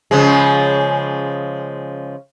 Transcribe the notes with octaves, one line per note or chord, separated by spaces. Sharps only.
C#3 F3 G#3